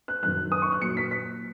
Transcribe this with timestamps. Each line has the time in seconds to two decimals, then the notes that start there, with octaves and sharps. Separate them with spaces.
0.08 F#6
0.23 F#2 D#3 F#3 F#6
0.52 D#6
0.62 C#6
0.72 F#6
0.82 A#2 F#3 C#7
0.97 B6
1.11 B6